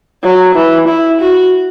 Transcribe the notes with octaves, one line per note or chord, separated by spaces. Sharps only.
F#3
E3
E4
F#4